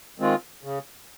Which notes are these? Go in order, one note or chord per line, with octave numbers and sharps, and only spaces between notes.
D#3 G#3 C4 F4
C#3